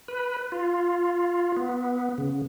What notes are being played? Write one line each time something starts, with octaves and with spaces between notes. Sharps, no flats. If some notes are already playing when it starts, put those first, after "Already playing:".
B4
F4
B3
C#3